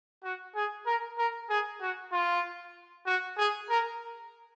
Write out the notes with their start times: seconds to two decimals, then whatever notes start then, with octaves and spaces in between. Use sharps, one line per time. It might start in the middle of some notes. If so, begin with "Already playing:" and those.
0.24 F#4
0.56 G#4
0.86 A#4
1.18 A#4
1.50 G#4
1.81 F#4
2.12 F4
3.07 F#4
3.38 G#4
3.70 A#4